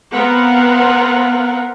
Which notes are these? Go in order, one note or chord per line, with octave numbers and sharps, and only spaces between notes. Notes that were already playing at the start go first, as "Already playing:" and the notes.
B3 C4 A#4 B4 F5 F#5